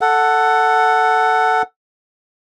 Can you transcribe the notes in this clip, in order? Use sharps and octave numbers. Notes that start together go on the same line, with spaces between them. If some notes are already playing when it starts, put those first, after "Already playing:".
A4 F#5